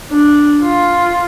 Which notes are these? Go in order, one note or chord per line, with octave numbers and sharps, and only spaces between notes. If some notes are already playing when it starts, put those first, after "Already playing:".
D4
F4